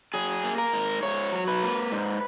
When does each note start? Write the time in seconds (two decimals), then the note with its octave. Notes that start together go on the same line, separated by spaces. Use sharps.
0.14 F#3 G#4
0.44 A#3
0.58 A#4
0.73 G#2
1.03 G#2 C#5
1.32 F#3
1.48 B4
1.62 A#3
1.91 G#2